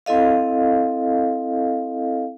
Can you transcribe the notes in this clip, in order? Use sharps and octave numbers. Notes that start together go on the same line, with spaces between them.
C4 E4 A4 D#5 F5